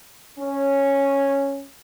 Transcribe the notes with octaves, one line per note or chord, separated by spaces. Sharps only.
C#4